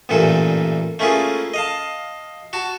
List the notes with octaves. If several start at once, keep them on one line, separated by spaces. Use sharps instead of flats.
A1 G2 A#2 E3 A#3 A4
A3 A#3 C#4 E4 F4 G#4
D#5 F5 A5
F#4 A5